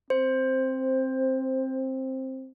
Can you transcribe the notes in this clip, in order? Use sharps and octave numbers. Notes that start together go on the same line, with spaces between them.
C4 C5